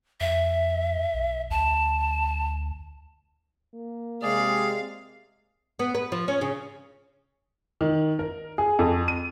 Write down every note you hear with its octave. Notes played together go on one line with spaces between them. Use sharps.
F2 E5
B1
D2 A5
A#3
C3 G#3 G#4 D5 F5
B3
B4
F3
C#4
C#3
D#3
A#4
G#4
F2
D#7